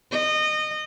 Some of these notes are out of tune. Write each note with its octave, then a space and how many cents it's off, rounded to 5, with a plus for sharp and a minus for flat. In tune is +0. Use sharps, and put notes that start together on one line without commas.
D#5 -25